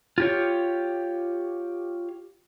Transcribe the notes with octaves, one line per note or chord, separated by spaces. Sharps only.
F4 G4 C#5